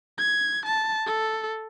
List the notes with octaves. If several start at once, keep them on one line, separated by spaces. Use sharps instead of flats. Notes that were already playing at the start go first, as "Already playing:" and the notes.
G#6
A5
A4